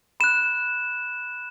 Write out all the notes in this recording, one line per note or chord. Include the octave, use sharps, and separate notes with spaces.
B5 F#6 E7